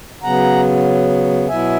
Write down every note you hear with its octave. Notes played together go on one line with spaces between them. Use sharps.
C#3 F#3 B3 F#5 A#5
B2 F#3 B3 E4 E5 G#5